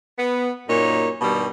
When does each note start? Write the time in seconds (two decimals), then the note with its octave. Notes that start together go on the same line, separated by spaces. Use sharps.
0.18 B3
0.68 F#2 A#2 D#4 C#5
1.22 G2 B2 D#3 G3